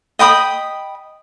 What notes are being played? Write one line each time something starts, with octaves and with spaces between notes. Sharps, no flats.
D#5 G5 B5 D#6